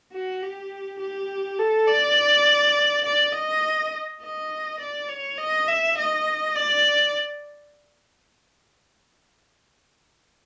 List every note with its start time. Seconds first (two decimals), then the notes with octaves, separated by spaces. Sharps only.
0.13 F#4
0.43 G4
1.00 G4
1.59 A4
1.88 D5
3.05 D5
3.34 D#5
4.22 D#5
4.80 D5
5.09 C#5
5.38 D#5
5.68 E5
5.98 D#5
6.55 D5